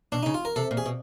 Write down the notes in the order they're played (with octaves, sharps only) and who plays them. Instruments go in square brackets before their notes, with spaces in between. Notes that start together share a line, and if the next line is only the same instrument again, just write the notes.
[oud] B2 [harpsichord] D4
[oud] C#3 [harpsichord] D#4
[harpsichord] F4
A#4
[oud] C3 [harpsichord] A4
[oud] A#2
[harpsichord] G#4
[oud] B2